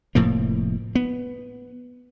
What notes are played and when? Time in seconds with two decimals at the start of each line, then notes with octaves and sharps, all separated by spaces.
0.15 F1 A2 F3 A#3
0.95 B3